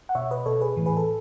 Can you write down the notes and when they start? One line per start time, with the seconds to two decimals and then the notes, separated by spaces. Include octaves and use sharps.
0.09 F#5
0.15 B2 C#5 E5
0.30 B4 D#5
0.46 B2 A4 C#5
0.61 G#4 B4
0.76 A2 E3
0.86 G#4 B4
0.97 A4